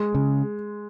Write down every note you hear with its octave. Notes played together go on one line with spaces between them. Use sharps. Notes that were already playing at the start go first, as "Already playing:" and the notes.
Already playing: G#3
C#3